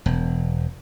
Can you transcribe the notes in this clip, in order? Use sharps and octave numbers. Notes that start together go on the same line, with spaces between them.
E1